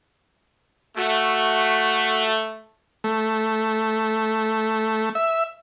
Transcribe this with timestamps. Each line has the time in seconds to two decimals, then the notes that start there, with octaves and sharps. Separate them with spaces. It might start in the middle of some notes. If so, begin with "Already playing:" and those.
0.98 A3 F#4
3.04 A3
5.15 E5